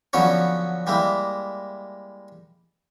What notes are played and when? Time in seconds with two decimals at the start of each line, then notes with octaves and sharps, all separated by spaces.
0.13 D3 F3 F#3 B3 C#4 C#5
0.87 G3 G#3 A#3 E4